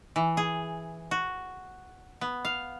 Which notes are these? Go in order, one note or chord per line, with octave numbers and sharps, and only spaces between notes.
E3
G#4
F#4
B3
F5